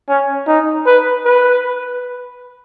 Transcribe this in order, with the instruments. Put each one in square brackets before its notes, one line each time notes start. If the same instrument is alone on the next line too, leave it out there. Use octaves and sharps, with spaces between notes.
[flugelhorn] C#4
D#4
B4
B4